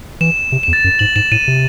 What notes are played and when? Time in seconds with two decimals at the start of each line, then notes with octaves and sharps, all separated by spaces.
0.21 E3 E7
0.52 C3
0.63 E7
0.68 E2
0.73 A6
0.84 F#2
0.99 G#2 F#7
1.16 G#2 E7
1.31 A2 D#7
1.48 C3